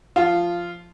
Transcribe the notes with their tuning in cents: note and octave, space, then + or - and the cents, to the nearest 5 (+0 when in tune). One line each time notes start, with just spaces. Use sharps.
F3 +0 F4 -10